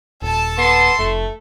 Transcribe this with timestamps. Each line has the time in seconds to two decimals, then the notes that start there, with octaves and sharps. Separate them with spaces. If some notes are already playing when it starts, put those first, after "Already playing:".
0.22 D#1 A4 A5
0.58 B3 C6
0.99 F1 A3